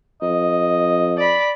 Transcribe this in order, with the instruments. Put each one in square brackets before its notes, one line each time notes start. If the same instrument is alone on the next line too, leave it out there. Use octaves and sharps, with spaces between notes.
[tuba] F2 [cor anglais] D#5
[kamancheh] D5 B5